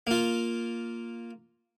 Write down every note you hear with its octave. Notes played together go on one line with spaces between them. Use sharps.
A#3 F4